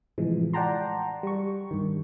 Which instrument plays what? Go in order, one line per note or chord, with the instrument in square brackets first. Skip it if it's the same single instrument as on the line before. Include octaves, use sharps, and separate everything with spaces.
[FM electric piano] A2 C3 E3 F3 G#3
D5 F#5 G5 A5 A#5 C6
G3 C#6
G2 D#3